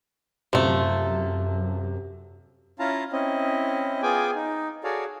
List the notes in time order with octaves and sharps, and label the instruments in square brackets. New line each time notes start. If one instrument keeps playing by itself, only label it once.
[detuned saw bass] F#2 [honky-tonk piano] C3 [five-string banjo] F3 A3
[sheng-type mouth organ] C#4 E4 F4 F5 A5 A#5
C4 C#4 E4 D#5
B3 F4 G#4 G5 G#5 D6
D#4
F#4 G#4 A4 C#5 D5 F5